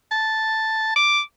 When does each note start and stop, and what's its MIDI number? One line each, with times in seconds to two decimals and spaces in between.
0.11 0.95 81
0.96 1.20 86